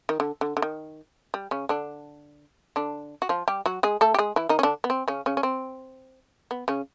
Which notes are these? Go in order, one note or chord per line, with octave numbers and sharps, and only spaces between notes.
D#3
D3
D3
D3
D#3
G3
C#3 C#4
D3 D4
D3 D4
F#4
F3 F4
G3 G4
F#3 F#4
G#3 G#4
A3 A4
G4
G#3 G#4
E3 E4
D#3 D#4
C#4
D3 D4
B3
C4
C#3 C#4
C#3 C#4
C#4
C4
B3
C#3 C#4